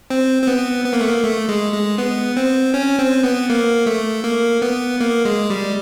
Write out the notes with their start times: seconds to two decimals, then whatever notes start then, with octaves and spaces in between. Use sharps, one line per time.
0.10 C4
0.42 C4
0.47 B3
0.85 B3
0.93 A#3
1.01 A3
1.08 A#3
1.23 A3
1.48 G#3
1.73 G#3
1.98 B3
2.37 C4
2.74 C#4
2.99 C4
3.23 B3
3.50 A#3
3.86 A3
4.24 A#3
4.62 B3
5.00 A#3
5.25 G#3
5.50 G3